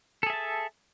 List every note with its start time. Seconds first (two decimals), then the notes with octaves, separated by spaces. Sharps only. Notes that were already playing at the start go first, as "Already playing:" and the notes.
0.23 A4
0.26 G#4
0.30 E5
0.33 A5